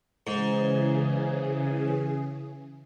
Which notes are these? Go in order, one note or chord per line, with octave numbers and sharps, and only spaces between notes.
G#2 C#3 E3 G#4